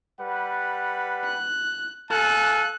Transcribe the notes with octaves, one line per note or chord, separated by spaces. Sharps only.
G3 B4 F#5
F#6
A4 F5 G#5 F#6